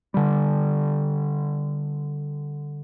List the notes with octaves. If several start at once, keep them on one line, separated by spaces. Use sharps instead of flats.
D3 G3